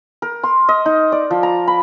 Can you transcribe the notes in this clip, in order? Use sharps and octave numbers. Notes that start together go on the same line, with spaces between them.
A#4
C6
D#5
D#4
D5
F3
A#5
B5